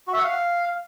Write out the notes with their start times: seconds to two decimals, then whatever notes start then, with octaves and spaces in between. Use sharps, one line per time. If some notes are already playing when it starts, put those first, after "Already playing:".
0.07 F#4
0.13 E5
0.19 F#5
0.24 F5